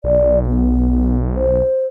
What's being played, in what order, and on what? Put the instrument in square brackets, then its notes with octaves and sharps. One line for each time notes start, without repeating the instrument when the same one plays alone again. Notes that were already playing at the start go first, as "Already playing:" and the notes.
[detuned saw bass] B1 [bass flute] D5
[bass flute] B3
C5